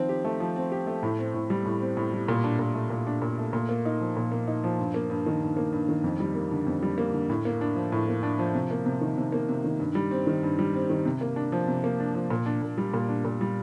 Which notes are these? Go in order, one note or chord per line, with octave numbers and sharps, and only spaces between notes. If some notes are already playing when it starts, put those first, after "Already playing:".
Already playing: D#3 F3 C4
G4
A3
F3
C4
G4
A3
A2
C4
A2
G3
A2
C4
A2
G3
A#2
D4
A#2
A3
A#2
D4
A#2
A3
A#2
A#3
D#4
F3
A#2
A#3
D#4
F3
G2
A#3
G2
D#3
G2
A#3
G2
D#3
F2
G3
A#3
D3
F2
G3
A#3
D3
A2
A#3
D4
F3
A2
A#3
D4
F3
C3
A#3
C3
D#3
C3
A#3
C3
D#3
G2
G3
C4
D#3
G2
G3
C4
D#3
C3
A#3
D4
F3
C3
A#3
D4
F3
A#2
D4
A#2
G3
A#2
D4
A#2
G3